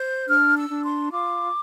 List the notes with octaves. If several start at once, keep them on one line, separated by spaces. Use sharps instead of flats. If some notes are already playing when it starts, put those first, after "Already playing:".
Already playing: C5 G6
D4 F6
E6
D4
C6
F4 D6